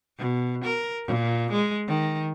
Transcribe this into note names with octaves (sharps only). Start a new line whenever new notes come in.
B2
A#4
A#2
G#3
D#3